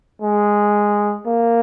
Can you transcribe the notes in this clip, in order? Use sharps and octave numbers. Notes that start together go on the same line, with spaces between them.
G#3
A#3